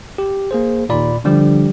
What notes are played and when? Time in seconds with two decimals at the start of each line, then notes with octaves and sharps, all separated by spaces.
0.18 G4
0.51 A#3 G#4 C5
0.90 D#2 A#2 D5 B5
1.25 D3 F3 G3 G4